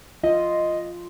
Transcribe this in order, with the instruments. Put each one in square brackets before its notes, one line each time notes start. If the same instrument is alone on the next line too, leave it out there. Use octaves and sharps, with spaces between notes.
[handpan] F4 [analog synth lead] D#5